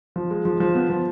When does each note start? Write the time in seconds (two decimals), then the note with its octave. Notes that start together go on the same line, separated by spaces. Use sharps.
0.16 F3
0.30 G#3
0.45 F3
0.60 F3
0.75 B3
0.90 F3